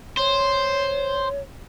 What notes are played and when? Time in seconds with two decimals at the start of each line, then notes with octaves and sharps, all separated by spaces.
0.17 C5 C#5